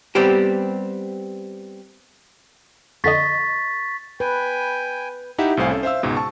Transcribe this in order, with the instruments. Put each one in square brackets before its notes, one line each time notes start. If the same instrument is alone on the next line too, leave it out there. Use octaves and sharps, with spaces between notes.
[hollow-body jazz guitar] G3 B3 C4 G4
[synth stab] F2 D3 D#5 [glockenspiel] C#6 A6 B6
[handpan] B4 [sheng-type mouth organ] G5 G#5
[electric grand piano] D#4 E4 G4 E5 F#5
C2 A2 C5 F5 G#5
C#4 A4
C5 E5 F5 E6
C#2 G#2 B2
A5 C#6